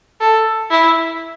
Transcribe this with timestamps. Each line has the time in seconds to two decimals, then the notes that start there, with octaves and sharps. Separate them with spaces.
0.21 A4
0.71 E4